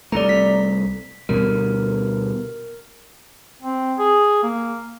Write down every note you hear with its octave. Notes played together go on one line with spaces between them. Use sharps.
C2 A3 D5 A#5
B6
D2 B2 G3 A#4
C4
G#4
A#3